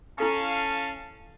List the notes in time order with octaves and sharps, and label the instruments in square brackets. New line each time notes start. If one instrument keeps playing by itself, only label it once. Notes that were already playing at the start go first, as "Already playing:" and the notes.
[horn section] C#4 F5 A5 [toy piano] E4 A4 D#6